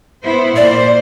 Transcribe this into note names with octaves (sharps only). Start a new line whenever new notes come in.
B3 E4 C5
A#2 C5 D5